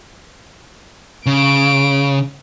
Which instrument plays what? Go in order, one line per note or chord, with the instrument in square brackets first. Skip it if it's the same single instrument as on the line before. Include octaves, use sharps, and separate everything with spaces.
[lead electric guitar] C#3 [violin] D7